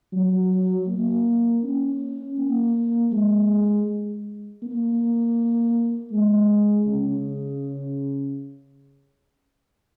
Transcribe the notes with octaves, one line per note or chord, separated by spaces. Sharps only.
F#3
A#3
C#4
A#3
G#3
A#3
G#3
C#3